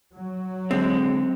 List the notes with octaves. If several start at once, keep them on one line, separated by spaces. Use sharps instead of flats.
F#3
D3 G#3 C4